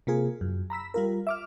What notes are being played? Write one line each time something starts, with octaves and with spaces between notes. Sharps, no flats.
C3 A#3 F4 G#4
F#2
A#5 B5 E6 B6
G3 F4 A#4
E5 D6 F6